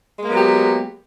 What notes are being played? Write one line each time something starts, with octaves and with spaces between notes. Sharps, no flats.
F#3 G#3 A#3 B3 G4